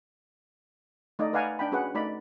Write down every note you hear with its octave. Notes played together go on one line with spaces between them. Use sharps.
A3 D#4 D5 D#5
B4 D5 F5 F#5 G#5 A#5
D4 G5 B5
C#4 F#4 G#4 B4 F#5
A3 D#4 D5 B5